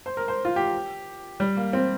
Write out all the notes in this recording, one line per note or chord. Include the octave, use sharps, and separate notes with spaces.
C5
A#4
C5
F4
G4
G3
A#3
C4